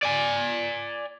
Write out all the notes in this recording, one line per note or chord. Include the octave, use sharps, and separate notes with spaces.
D5 G#5